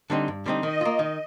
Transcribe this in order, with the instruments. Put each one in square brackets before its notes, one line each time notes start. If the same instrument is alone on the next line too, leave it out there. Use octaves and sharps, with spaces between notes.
[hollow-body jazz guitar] D3 G3 C4 D#4
G2
D3 G3 C4 D#4
[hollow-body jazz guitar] D#3 [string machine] D#5
[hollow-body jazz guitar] A#3 F4
D#3